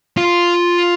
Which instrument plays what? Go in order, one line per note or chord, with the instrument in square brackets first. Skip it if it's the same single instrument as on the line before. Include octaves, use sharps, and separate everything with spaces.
[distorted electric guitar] F4